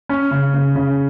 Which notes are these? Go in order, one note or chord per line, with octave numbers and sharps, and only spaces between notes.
C#4
C#3
C#3
C#3